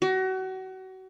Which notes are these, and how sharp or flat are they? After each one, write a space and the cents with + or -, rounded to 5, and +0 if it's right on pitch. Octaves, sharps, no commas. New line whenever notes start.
F#4 +30